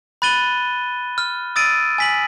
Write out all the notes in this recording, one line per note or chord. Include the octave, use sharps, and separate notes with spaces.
B5 F#6 A6 D#7 G7
F6
D#6 E6 A6 D7 D#7
G#5 B6 F#7